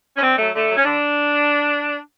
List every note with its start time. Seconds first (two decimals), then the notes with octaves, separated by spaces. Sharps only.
0.17 C#4
0.21 D3 C4
0.38 F#3 A3
0.53 D3 A3
0.69 F#3
0.77 C#4
0.84 D3 D4